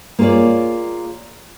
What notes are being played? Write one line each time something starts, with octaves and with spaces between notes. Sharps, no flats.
A#3 F4 G#4 C#5 D5